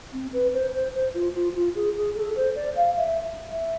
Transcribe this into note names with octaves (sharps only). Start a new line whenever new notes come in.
C4
B4
C5
C5
C5
F4
F4
F4
G#4
G#4
A4
C5
D5
F5
E5
E5